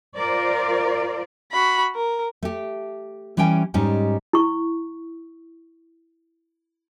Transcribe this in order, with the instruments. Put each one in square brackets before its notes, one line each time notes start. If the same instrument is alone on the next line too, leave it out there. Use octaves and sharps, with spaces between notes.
[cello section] F4 A#4 C5 D5
[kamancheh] F#4 B5
A#4
[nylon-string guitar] A3 G4
E3 G3 C#4 G4 G5 G#5
G#2 G3 C#4 D#4 G4
[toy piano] E4 C#6